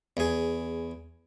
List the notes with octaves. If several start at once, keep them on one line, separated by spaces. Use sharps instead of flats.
E2 G#4